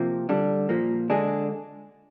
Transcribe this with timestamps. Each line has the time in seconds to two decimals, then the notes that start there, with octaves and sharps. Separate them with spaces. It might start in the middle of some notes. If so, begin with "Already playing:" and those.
Already playing: C3 F3 A#3
0.29 D3 G3 D4
0.69 A#2 F3 A#3
1.10 D3 G#3 D4 G#4